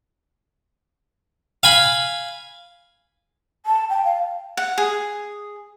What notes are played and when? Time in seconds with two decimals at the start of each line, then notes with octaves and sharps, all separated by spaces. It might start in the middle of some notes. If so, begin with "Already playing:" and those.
1.63 F5 G#5 B5
3.66 A5
3.90 G5
4.05 F5
4.57 F#5
4.78 G#4